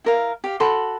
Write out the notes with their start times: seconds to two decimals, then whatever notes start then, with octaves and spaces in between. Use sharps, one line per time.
0.04 E4 A#4 F5
0.44 G4 F5
0.60 F#4 A4 B5 C6